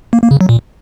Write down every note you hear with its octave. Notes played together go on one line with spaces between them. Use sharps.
A#3
A#3
C#3
F#3
A#2